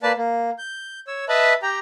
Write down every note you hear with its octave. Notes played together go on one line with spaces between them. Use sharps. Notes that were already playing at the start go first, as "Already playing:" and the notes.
A#3 B4 D5 A5
A#3
G6
C#5 E6
B4 D#5 E5 A5 B5
G4 G5 A#5